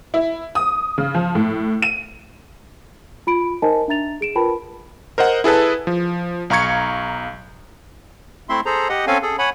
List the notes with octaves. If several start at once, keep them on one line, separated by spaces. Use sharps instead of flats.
E4
D#6
C#3
F3
A2
D#7
F4 B5 D7
D#4 A#4 C5 D#5 G#5 A5
D4 E5 A#5 A6 F7
G#4 D7 E7
F4 A#4 B4 G5 A5 B5
A#4 C5 D#5 F#5
E4 G#4 A4 B4 A5
F3
B1 F5 A#5 C#6 G#6 C#7
A3 C4 E4 E5 C6
G#4 A4 C5 A#5
G4 D#5 F#5
C4 C#4 A4 F5 G#5
G#4 A4
C#5 F#5 G#5 B5